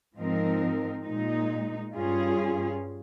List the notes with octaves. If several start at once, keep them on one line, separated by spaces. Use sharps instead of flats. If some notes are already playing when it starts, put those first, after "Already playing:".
G#2 F3 C4 D#4 A#4
A#2 G#3 D#4
G2 G3 C#4 F4 G#4